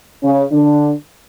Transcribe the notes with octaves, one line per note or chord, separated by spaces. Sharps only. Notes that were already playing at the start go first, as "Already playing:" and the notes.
C#3 C#4
D3 D4